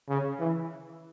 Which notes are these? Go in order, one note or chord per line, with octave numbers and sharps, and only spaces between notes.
C#3
E3